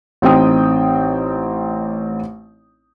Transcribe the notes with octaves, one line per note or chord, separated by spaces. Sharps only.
A1 C4 D#4 G5 D#6